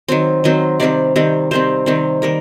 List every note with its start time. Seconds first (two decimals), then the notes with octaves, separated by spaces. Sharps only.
0.08 D#3 F#3 C4
0.44 D#3 F#3 C4 D#5
0.80 C3 D#3 G3 C4 D5
1.16 C3 D#3 G3 C4
1.51 C3 D#3 G3 C4 C5
1.86 C3 D#3 G3 C4
2.22 D#3 G3 A#3 A#4